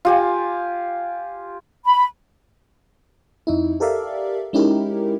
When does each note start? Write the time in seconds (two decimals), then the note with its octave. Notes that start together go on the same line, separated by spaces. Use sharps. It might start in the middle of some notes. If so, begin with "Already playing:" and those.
0.05 F4 G4 G#5
1.86 B5
3.47 F2 D#4 E4
3.80 G4 A4 A#4 D5 E5 F5
4.53 G#3 C#4 D#4 E4 G4 A#4